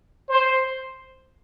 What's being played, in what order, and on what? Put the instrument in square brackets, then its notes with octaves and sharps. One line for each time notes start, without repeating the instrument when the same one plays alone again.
[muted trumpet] C5